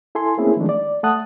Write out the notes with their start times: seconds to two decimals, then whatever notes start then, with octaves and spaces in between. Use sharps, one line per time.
0.15 E4 A4 G#5 C6
0.37 A3 A#3 C4 C#4 E4 G#4
0.57 D#3 F3 G#3 A3 D4
0.69 D5
1.03 A3 F#5 A5 D#6 F#6